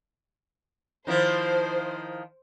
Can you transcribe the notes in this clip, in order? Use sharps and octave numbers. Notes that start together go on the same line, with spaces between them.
D#3 F3 E4 C5